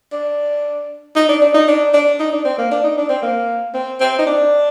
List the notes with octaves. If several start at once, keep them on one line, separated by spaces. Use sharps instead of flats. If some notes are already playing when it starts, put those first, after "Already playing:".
D4
D#4
D4
D4
D#4
D4
D4
D#4
D4
C4
A#3
D4
D#4
D4
C4
A#3
C4
C4
D#4
D4